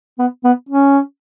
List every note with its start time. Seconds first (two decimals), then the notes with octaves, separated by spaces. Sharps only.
0.19 B3
0.44 B3
0.69 C#4